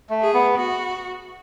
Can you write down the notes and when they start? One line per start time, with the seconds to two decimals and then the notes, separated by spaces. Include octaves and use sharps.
0.10 A3
0.21 G#4
0.34 B3
0.57 F#4